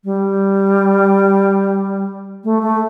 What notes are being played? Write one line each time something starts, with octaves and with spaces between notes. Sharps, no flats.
G3
A3
A3